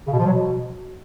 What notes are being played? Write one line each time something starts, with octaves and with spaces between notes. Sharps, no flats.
C#3
B2
F3
F#3
B2